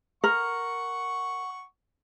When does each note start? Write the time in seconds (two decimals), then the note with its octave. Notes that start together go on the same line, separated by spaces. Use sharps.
0.24 A#4 F#5 C#6